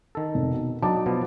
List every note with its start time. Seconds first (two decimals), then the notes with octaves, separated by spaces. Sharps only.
0.15 D#3 A4
0.35 F1
0.51 B2
0.82 F#3 D4 D#4 A5 D6
1.06 B2 F3 B3